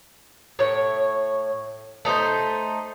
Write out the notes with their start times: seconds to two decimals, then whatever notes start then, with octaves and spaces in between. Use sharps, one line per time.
0.59 A2 C#5
2.05 A3 D#4 F4 C5